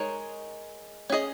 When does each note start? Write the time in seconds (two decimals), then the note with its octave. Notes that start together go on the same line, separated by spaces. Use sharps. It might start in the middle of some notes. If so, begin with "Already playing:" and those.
Already playing: G#3 D#4 A#4 C#5
1.10 C#4 G#4 D#5